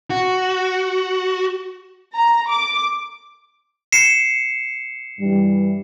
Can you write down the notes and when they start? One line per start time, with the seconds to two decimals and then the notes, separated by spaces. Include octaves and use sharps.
0.10 F#4
2.15 A#5
2.49 D6
3.92 C7 C#7 E7
5.20 G2 E3 G3